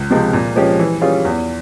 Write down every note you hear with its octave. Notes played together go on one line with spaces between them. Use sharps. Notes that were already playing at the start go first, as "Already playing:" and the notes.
Already playing: C#2
C3 F3 G#3 C4
A#2
F3 G#3 C#4 G4
E3
G3 C#4 F4 G#4
E2